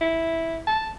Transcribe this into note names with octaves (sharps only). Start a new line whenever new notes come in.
E4
A5